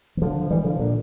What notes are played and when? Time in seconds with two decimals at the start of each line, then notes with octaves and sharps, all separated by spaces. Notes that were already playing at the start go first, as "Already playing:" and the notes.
0.17 E3
0.22 D3 F3
0.51 E3 G3
0.64 D3 F3
0.79 A#2 D3